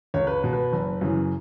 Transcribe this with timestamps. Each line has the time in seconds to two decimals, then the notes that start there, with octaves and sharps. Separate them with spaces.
0.14 C#2 C#5
0.27 B4
0.44 B2
0.53 B4
0.73 F#1
1.01 F#2 C#3 E3